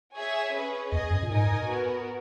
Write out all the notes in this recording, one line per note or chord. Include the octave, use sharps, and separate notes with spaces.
G#4 C#5 E5 G#5
C#4 G#4 B4
E2 G#4 D#5 G#5
F#2
A#2
G#2 D#4 A#4 D#5 G#5
B3 F#4 A#4